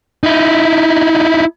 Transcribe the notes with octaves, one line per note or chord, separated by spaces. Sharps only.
D#4 E4